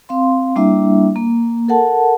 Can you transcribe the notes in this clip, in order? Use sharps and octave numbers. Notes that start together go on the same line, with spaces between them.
C4 F5 C6
G3 A#3 D4 E4 E5
A#3
A4 A#4 F#5 A5